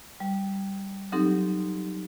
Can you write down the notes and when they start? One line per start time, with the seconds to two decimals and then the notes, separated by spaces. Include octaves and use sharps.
0.20 G3
1.12 F#3 C4 D#4 G4 A4